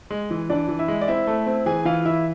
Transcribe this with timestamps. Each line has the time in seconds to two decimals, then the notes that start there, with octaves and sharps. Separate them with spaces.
0.11 G#3
0.31 E3
0.50 E3 D4 D5
0.69 E3
0.79 E4 E5
0.88 G#3
1.01 D5
1.08 C4 E4 E5
1.27 A3
1.46 C4
1.66 E3 G#4 G#5
1.85 E3 F4 F5
2.05 E3 E4 E5